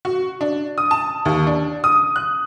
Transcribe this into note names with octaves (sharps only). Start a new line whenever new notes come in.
F#4
D4
D#6
A5
D#2
D4
D#6
F#6